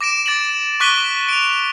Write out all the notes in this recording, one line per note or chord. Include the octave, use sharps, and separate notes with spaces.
D6 A#6 D7 E7
D6 A6 A#6 D7 F#7
C#6 D6 F#6 B6 D#7 G7
D7 F7